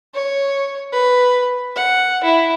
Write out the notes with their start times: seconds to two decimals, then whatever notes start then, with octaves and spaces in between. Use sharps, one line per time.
0.14 C#5
0.93 B4
1.75 F#5
2.23 E4